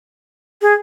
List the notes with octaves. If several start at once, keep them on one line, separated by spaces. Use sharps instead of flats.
G#4